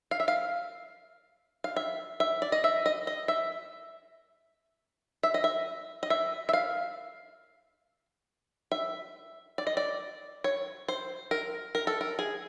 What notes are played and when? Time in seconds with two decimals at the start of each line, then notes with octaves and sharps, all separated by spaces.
0.11 F5
0.20 E5
0.28 F5
1.64 F5
1.76 E5
2.20 E5
2.42 D5
2.52 D#5
2.64 E5
2.86 D#5
3.07 D#5
3.28 E5
5.23 E5
5.34 D#5
5.44 E5
6.03 D#5
6.10 E5
6.49 E5
6.53 F5
8.72 E5
9.58 D5
9.67 D#5
9.77 D5
10.44 C#5
10.88 C5
11.31 A#4
11.75 A#4
11.87 A4
12.01 A#4
12.19 G#4